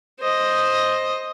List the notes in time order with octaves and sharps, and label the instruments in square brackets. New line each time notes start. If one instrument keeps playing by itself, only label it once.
[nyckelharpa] C5 D#5